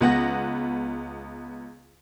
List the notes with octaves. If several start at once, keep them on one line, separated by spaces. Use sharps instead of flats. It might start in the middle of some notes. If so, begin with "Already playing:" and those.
C#2 B3 F#5 A#6